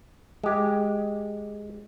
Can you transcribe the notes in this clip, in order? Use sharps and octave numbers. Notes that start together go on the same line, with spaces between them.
G#3 G4